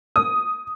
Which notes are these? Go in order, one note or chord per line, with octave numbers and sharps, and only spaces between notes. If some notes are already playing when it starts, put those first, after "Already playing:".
D#6